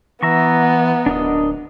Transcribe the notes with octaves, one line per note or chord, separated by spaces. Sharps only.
E3 B3 E5 A#5 C#6
D1 D4 A#4 D#5